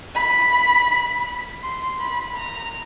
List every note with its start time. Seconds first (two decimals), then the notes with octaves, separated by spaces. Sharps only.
0.15 B5
1.62 C6
2.00 B5
2.36 A#5